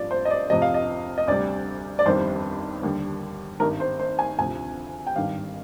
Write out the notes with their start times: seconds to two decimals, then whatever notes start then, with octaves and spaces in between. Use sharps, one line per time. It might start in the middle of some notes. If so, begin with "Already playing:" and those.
Already playing: G#1 G2 F3 D5
0.11 C5
0.25 D#5
0.31 D5
0.50 F2 C3 F3 D#5
0.62 F5
0.74 D#5
1.18 D#5
1.28 D2 C3 G3 D5
1.99 D5
2.06 G1 F2 D#3 G3 C5
2.82 D#2 D3 G3
3.60 G#1 G2 D#3 A#4
3.80 C5
4.00 C5
4.19 G#5
4.39 D2 C3 F3 G#5
5.07 G5
5.16 G#1 G2 D#3 G3 F5